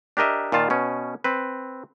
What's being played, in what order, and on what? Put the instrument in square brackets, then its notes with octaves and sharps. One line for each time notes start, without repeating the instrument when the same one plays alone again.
[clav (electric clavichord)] D4 G4 A#4 D#5 E5
A#2 D#3 F4 A5
B2 C#4
C4 B4